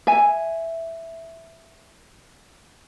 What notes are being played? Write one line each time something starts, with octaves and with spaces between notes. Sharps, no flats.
E5 G#5